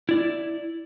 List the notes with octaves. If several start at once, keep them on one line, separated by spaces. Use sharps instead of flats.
E4 D5